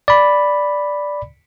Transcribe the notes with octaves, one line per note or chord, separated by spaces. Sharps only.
D5 B5